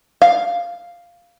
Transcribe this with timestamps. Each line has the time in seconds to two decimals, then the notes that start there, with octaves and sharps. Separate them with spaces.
0.22 F5